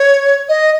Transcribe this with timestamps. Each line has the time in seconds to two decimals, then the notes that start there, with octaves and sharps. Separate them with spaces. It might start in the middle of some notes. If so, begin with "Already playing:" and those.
Already playing: C#5
0.49 D#5